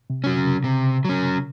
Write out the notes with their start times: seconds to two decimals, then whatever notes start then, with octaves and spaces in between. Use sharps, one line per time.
0.10 C3
0.24 F#3 C#4
0.37 C#3
0.64 C3
1.05 F#3 C#4